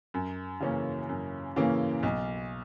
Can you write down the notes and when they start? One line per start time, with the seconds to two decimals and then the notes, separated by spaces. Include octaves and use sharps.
0.14 F#2
0.60 C#3 E3 A#3 C#4
1.09 F#2
1.56 C#3 E3 A#3 C#4
2.03 B1